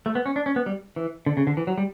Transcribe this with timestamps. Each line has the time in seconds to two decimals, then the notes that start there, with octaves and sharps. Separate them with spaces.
0.06 A3
0.15 B3
0.26 C#4
0.36 D4
0.46 C#4
0.56 B3
0.66 G3
0.96 E3
1.26 D3
1.37 C#3
1.47 D3
1.57 E3
1.67 F#3
1.78 G3